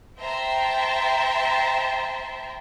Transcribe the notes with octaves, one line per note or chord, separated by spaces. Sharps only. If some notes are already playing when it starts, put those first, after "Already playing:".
C5 E5 G5 A5 A#5 C6